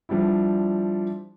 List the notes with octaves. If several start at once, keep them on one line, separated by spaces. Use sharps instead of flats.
F3 G3 D4 E4